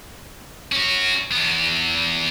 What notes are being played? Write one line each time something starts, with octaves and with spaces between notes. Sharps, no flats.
C#4 F#4
E2 B3